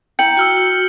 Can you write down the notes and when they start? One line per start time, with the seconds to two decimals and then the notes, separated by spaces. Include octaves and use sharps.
0.19 E4 G5 A#5 G6 C#7 F#7
0.37 F#4 E6 F6 C#7